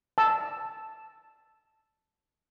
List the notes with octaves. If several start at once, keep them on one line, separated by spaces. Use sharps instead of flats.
A5 E6